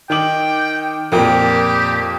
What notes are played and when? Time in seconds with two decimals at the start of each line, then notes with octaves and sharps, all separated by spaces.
0.10 D#3 G5 D6 F#7
1.12 F2 A#2 F3 G4 A#4 G5